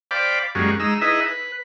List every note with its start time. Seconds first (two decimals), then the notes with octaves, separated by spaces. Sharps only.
0.11 C5 D5 F5 G5 B5 D6
0.55 F#2 G3 G#3 A#3 C#4 F#4
0.80 G#3 D#4 A#5 E6
1.02 D#4 E4 G#4 B4 D#5 E5
1.26 B4